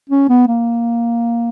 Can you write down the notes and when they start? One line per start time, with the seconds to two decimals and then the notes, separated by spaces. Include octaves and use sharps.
0.10 C#4
0.29 B3
0.48 A#3